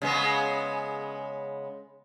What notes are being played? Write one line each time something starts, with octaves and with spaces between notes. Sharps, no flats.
C#3 G#3 B3